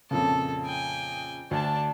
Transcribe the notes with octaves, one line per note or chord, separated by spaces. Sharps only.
F2 A#2 C#3 A4
G5 G#5
D2 D4 A5